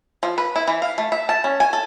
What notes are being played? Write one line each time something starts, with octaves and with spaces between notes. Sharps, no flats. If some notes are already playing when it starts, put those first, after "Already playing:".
F3
B4
E4
E3
F5
A3
E5
A5
C#4
G#5
A4